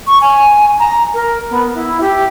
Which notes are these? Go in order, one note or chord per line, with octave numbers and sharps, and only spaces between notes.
C#6
G#5
A#5
A#4
B3
E4
G4